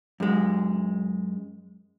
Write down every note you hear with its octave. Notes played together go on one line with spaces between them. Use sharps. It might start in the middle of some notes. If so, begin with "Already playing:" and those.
F#2 G#3